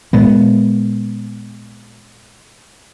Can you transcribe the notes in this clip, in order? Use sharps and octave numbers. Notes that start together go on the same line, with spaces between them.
A#2 G#3 B3